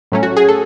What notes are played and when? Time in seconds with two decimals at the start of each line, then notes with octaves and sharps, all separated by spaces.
0.12 A2 F#3 A3 C#4
0.23 F#4
0.37 G#4
0.48 A4